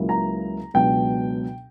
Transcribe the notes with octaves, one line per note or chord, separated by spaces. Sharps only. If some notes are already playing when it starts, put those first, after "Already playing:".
Already playing: C#2 C#3 F#3 A#3 E4
A#5
C#2 B2 F#3 B3 D4 G5